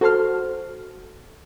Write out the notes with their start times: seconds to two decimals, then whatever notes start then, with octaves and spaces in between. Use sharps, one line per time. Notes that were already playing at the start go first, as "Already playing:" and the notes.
0.01 F#4 A4 C5 A5 C6 F6